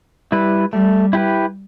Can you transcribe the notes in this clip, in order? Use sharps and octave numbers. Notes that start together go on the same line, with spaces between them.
G3 E4 B4
G3 A3
E4 G4 B4